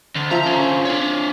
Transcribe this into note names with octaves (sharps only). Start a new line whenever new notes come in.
D2
F3 E5 A#5
D3 C#4
D4 C#5